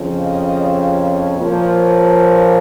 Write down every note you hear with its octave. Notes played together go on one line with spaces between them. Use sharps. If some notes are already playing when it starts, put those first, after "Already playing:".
Already playing: F2 C#3 F3
D#5
C#5
A#2 F3